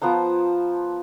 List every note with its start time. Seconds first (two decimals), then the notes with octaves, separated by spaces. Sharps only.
0.02 F3 B3 C5 A#5